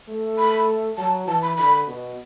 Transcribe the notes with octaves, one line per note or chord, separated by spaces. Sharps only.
A3
B5
F#3 A5
E3 A5
B5
D3 B5
B2